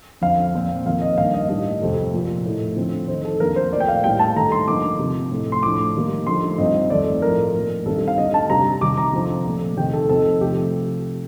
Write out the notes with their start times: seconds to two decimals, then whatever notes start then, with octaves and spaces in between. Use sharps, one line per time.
0.22 F2 D3 F3 F5
0.54 A#2 F3 C4
0.85 F2 D#3 A#3 F5
1.02 D#5
1.17 G2 D#3 A#3 D4 F5
1.34 D#5
1.49 A2 G3 D4 D#5
1.82 F2 C3 F3 A3
2.13 A#2 F3 A#3
2.45 A2 A3 D#4
2.77 D3 F3 C4
3.08 D#3 A3 D#4 C5
3.25 A4
3.40 F2 D#3 A#3 D4 A#4
3.56 C5
3.72 A#2 A3 D#4 D5
3.80 G5
3.88 F5
4.04 A2 G3 A#3 G5
4.19 A5
4.36 G2 D#3 A3 D#4 A#5
4.52 C6
4.67 D3 F3 A#3 D#4 D6
4.99 C3 F3 C4 D#4
5.31 A2 A3 D#4
5.52 C6
5.63 A2 F3 A3 D4 D6
5.95 D#3 G3 A#3
6.27 D3 F3 A3 D#4 C6
6.58 G2 F3 C4 D#4 D#5
6.90 F2 D#3 A3 C4 D#4 D5
7.22 A2 F3 A3 D#4 A#4
7.54 A#2 A3 D#4
7.86 G2 D#3 G3 C4 D#4 A4
8.08 F5
8.18 D3 A3 D#4 D#5
8.34 A5
8.50 C3 G3 D4 A#5
8.81 C3 D#3 G3 D6
8.97 A#5
9.13 D3 F3 C4 D#4
9.45 A#2 F3 A3
9.77 C3 D#3 A3 D#4 G5
9.93 A4
10.09 C3 F3 C4 D#4 A4
10.41 C3 F3 A3 G4